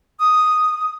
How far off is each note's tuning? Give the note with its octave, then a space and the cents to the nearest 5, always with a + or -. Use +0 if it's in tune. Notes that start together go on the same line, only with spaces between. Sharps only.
D#6 +0